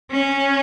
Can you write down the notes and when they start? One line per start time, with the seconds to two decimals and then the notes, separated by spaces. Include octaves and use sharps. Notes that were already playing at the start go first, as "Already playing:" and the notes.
0.11 C#4